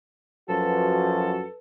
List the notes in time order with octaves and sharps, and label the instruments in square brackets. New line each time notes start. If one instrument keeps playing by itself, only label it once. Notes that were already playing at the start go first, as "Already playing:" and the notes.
[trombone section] F#2 F3 F#4 [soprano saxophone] A4 [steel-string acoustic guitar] B4